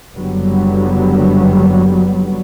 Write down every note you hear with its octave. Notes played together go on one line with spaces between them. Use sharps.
F#1 D3 F#3 G3 B3